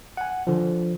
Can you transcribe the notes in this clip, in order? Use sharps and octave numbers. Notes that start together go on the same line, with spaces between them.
F#5 G#5
D3 F3